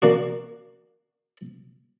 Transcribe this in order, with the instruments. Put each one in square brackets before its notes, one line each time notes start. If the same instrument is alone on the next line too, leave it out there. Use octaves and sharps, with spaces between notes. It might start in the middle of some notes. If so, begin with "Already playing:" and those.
[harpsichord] A#3 D4 F#4